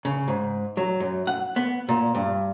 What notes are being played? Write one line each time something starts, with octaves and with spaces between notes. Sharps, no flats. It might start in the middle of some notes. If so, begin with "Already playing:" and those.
C#3
G#2
F#3
F#2
F#5
B3
A#2
G2